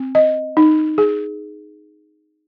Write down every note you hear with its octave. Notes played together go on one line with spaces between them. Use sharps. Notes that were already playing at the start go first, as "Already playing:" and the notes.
Already playing: C4
D#5
D#4
G#4